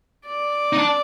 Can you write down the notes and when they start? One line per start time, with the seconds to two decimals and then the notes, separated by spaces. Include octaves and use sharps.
0.26 D5
0.73 D#4
0.78 D4